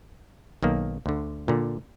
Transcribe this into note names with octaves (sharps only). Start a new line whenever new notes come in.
B1 D#3 A#3
D2 D3
A#2 D3